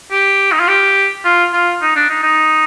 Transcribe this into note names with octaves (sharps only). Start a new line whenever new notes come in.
G4
D#4
F4
G4
F4
F4
D#4
D4
D#4
D#4